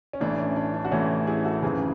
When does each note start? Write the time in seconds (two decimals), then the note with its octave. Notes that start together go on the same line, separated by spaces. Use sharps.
0.13 C#4
0.20 A1 A2 E3 D4
0.38 C#4
0.56 D4
0.74 D4
0.85 F#4
0.91 A1 A2 E3 C#4 E4
1.27 E4 G#4
1.45 F#4 A4
1.63 G#1 F#2 C#3 E3 G#4 B4